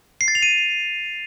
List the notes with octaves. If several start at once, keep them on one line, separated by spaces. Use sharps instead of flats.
C7
A6
F7
D#7